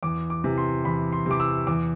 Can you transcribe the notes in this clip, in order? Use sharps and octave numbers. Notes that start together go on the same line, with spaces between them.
E2 D6
D6
C3 E3
C6
E2 B5
C6
C3 E3 D6
E6
E2 D6